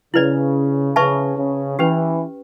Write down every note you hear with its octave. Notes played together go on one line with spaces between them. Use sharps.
C#3 E4 B4 D5
C#3 B4 E5 A5 C#6
C#3
E3 C#4 G4 B4